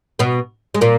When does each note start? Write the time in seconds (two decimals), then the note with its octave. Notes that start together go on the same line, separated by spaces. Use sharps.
0.19 B2 B3
0.74 G#3
0.81 A#2 A#3